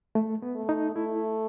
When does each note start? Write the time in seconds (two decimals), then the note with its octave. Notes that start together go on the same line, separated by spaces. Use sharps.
0.15 A3
0.42 B3
0.55 A3
0.69 D#4
0.96 A3 E4